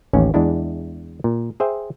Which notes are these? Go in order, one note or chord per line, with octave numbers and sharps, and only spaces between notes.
A1 D#2 C#4
E2 G#3 D4 E4
A#2
G#4 C5 E5 G5